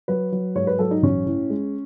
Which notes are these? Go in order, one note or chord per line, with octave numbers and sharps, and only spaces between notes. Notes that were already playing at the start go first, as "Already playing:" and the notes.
F#3 B4
F#3
G#2 C#5
B4
F#3 A4
D#4
A1 C#4
A2
G#3